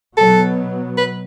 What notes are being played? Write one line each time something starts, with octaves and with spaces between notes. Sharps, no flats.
B2 F#3 B3 A4
B4